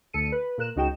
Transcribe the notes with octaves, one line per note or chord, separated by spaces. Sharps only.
D2 A4 C#7 D#7
B4
A#2 A#4 F#6 E7
C#2 D#4 F#4 G5 E7